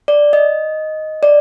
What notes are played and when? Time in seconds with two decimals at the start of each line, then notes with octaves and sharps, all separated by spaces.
0.08 D5
0.33 D#5
1.23 D5